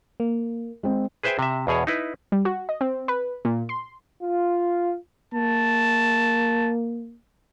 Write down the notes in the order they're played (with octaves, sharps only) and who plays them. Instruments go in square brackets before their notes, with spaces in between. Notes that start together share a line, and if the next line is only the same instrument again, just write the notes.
[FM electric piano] A#3
[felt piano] G#3 C4
[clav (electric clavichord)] G#4 B4 C5 E5 G5 G#5
C3 E5
E2 B2 G#4 C#5
D#4 E4 B4
[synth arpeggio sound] G3
F#4
D#5
C4
B4
A#2
C6
[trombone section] F4
[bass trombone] A#3 [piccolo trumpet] A5